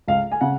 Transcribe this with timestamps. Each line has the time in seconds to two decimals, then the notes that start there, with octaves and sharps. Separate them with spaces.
0.08 C#2 F5
0.32 G#5
0.41 C#3 F#5